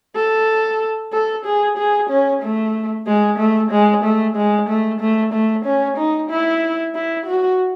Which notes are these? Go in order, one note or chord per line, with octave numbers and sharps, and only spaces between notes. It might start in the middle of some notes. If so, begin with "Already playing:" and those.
A4
A4
G#4
G#4
C#4
A3
G#3
A3
G#3
A3
G#3
A3
A3
A3
C#4
D#4
E4
E4
F#4